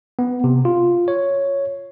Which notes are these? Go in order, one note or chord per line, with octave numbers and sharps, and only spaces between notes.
B3
C3
F4
C#5